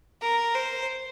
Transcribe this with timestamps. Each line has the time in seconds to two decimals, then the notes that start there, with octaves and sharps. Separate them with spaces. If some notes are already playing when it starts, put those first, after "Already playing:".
0.21 A#4
0.54 C5